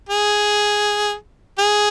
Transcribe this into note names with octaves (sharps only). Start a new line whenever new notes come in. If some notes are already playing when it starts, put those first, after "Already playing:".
G#4
G#4